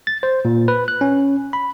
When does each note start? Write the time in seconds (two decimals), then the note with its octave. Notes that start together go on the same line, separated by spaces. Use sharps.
0.07 A6
0.23 C5
0.45 A#2
0.68 B4
0.88 F#6
1.01 C#4
1.53 B5